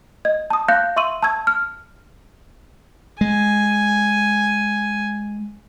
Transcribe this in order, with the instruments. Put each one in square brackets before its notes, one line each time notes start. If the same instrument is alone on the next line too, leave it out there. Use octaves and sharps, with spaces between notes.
[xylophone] D#5 G#6
A5 D#6
F5 F#6 G6 A#6 C#7
E5 C6 C#6 E6 D#7 F#7
A5 C#6 E6 G#6
F6
[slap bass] G#3 [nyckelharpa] G#5